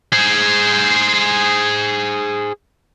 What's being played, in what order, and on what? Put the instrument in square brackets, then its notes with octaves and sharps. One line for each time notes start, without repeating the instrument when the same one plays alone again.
[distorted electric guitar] G#4 C5